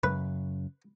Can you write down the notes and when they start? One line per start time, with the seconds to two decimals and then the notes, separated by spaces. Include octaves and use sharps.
0.03 F#2 C#3 B4